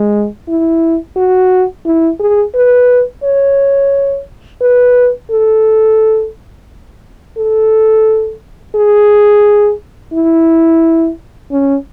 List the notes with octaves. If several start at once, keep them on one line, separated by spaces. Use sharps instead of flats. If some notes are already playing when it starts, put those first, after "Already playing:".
Already playing: G#3
E4
F#4
E4
G#4
B4
C#5
B4
A4
A4
G#4
E4
C#4